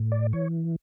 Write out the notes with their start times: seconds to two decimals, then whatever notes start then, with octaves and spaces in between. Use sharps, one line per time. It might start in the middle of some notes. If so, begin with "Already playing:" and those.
Already playing: A2
0.12 D5
0.33 E3 C#5